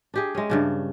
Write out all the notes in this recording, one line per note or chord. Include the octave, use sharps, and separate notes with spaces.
D4 G4 G#4
G#3 C#4
G2 C#3 D4